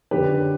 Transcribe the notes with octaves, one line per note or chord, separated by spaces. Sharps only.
F#2 D3 F#3 G4 B4